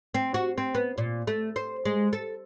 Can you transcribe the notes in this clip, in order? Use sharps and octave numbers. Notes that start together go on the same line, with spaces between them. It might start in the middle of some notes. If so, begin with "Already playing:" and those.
C4
F#4
C4
B3
A#2
A3
C5
G#3
A4